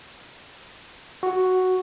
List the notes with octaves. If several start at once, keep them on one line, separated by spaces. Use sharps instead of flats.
F#4